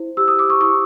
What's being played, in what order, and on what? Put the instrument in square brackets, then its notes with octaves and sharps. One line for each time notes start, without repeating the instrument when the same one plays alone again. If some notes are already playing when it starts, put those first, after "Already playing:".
Already playing: [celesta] E4 C5
G4 E6
D#6
D6
C#6 D#6
E4 C#6 D#6